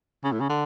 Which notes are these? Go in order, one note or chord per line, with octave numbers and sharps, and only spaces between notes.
C#3
A2
C#3
D3